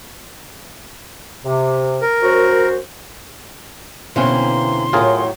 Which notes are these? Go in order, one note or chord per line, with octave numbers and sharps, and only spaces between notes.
C3
A#4
F#2 F#4 C5
B2 D3 E3 A#3 C4 C#4 C6
A2 F#3 F4 G#4 A#4